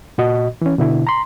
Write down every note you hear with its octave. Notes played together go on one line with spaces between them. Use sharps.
A#2 F#4 D#5
E3 C#4
B2 D3 E4
A#5 C6